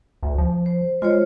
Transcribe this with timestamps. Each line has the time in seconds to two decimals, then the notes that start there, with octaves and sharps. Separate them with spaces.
0.23 D2
0.38 F3
0.66 C5
1.02 G#3 F4 C5 C#5